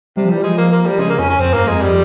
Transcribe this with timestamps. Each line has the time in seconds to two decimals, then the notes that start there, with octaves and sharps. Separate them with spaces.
0.17 C3 G3
0.25 F3
0.30 E3 G3
0.41 F3 G#3
0.58 A#3
0.72 A#3
0.86 G3
0.99 C#3 G#3
1.10 A#3
1.19 F2 C#4
1.30 C#4
1.40 F2 C4
1.54 G2 A#3
1.67 F2 G#3
1.82 G3